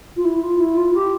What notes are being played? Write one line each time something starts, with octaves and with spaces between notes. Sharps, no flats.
F4
E4
F4
E4
F4
G4